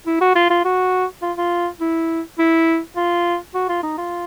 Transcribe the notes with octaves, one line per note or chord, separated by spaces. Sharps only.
E4
F#4
F4
F4
F#4
F4
F4
E4
E4
F4
F#4
F4
D#4
F4